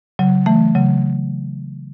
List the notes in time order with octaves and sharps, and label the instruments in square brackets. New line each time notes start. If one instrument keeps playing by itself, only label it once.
[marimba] C#3 F#3
E3 A3
C#3 F#3